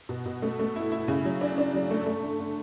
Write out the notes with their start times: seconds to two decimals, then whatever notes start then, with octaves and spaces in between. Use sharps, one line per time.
0.09 B2
0.26 B2
0.42 A3
0.59 A3
0.76 E4
0.92 E4
1.08 C#3
1.25 F#3
1.41 D4
1.58 D4
1.74 F#3
1.91 A3
2.06 A3
2.23 D3
2.40 D3